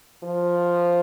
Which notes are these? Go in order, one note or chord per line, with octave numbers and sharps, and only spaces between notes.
F3